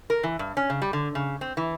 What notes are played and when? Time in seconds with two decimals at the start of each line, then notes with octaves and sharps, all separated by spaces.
0.10 A#4
0.23 E3
0.39 G2
0.57 C#4
0.70 C#3
0.82 G3
0.93 D3
1.15 C#3
1.41 C4
1.57 E3